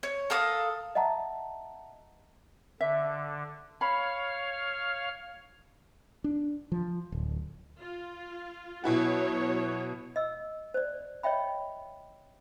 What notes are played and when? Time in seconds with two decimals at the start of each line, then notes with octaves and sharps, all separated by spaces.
0.03 C#5
0.30 A4 A#4 F5 D#6
0.95 D#5 E5 F#5 A5 A#5
2.81 D3 E5
3.81 C#5 F5 B5 F6
6.24 D4
6.72 F3
7.12 D1
7.79 F4
8.84 B2 F#3 E4 F#4 C#5
10.16 D#5 E6
10.74 C5 D5
11.23 C#5 D#5 E5 G5 B5